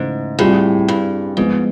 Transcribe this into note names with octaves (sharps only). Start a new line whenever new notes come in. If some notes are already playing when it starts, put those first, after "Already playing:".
Already playing: G#2 C#3 E3 A3
A2 G3 C4 F4 G#4
G2
G#2 F3 G#3 B3